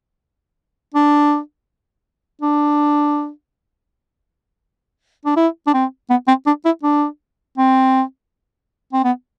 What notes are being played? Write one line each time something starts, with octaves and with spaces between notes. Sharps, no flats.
D4
D4
D4
E4
D4
C4
B3
C4
D4
E4
D4
C4
C4
B3